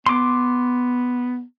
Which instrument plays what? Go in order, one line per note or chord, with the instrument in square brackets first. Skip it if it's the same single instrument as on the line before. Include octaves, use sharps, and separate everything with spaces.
[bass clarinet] B3 [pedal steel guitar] C6 D6